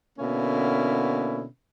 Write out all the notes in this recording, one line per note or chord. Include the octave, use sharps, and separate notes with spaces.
B2 D3 A#3 C#4 E4